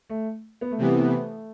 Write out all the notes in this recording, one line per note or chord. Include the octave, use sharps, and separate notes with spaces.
A3
B3
A3
C3 E3 G3 B3
A3